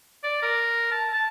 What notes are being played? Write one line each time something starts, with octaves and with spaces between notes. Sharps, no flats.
D5
A#4
A5
A5